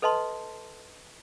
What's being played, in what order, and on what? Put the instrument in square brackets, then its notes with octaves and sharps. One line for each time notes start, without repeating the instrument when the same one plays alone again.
[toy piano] A4 B4 D#5 A5 C6